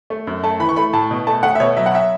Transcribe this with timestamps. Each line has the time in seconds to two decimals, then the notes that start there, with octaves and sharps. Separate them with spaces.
0.10 A3
0.27 F#2
0.44 A3 A5
0.60 E3 B5
0.69 C#6
0.76 A3 B5
0.93 A2 A5
1.11 B2
1.27 A3 A5
1.43 A3 F#5
1.55 E5
1.60 B2 C#5
1.77 F#3 E5
1.86 F#5
1.95 E5